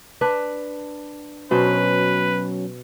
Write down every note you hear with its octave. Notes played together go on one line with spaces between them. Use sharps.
D4 B4
B2 F#3 C#4 B4 C5